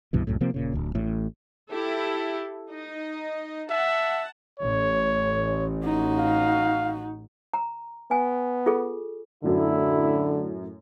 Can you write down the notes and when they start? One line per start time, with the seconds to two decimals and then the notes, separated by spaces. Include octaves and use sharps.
0.13 C2 G2 B2 E3
0.27 C2 F#2 A2
0.41 C3 F3 A#3 C4
0.54 D#1 A#2 C#3
0.74 D1 D2
0.95 A1 A2
1.71 E4 G4 A4
2.71 D#4 D#5
3.70 E5 F#5 A5
4.60 A1 C#5
5.85 D#4 F#4
6.19 F5
7.54 A#5
8.11 B3 G#5
8.66 F4 G#4 A4
9.43 F#2 A2 D3 E4